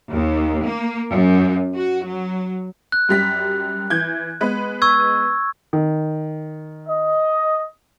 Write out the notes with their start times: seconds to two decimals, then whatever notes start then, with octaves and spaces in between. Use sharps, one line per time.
0.11 D#2
0.63 A#3
1.11 F#2
1.76 F#4
2.06 F#3
2.92 F#6
3.09 F#2 G3 B6
3.90 E3 G6 G#6
4.41 G#3 B3 B4
4.82 C#6 E6 G#6
5.73 D#3
6.87 D#5